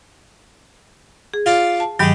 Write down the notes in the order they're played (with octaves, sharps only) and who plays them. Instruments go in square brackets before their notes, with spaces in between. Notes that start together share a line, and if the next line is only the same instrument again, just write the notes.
[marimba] G#4
[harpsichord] F4 D5
[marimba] A5
[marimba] G2 D#3 F#3 [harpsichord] G#3 G4